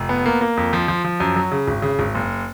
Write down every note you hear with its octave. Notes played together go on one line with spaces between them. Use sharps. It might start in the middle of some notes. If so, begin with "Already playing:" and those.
Already playing: F1
B3
A#3
A#3
F2
F3
F3
F3
F#2
F#3
C#3
G#1
C#3
G#1
F#1